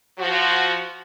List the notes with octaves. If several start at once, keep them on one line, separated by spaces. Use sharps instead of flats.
F3 F#4